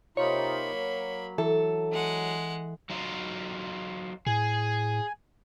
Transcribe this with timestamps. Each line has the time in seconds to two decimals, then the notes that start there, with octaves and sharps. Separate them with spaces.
0.17 C3 A#3 D#4 F4 C#5 B5
0.73 F#3
1.38 E3 A4
1.92 G#3 F#5
2.90 F#3 D#4 F4
4.27 A2 G#4 G#5